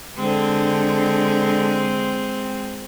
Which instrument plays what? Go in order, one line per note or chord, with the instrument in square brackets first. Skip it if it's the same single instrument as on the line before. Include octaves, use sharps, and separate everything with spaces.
[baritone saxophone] D3 [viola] G#3 C4